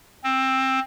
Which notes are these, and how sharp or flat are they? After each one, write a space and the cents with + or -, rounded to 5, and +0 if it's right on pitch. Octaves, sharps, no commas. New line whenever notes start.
C4 +15